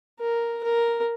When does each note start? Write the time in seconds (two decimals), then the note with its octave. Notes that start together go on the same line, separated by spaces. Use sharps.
0.20 A#4
0.63 A#4